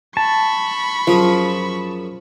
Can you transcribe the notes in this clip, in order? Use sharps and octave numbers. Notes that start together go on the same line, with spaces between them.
A5 B5 C#6
F#2 F3 G#4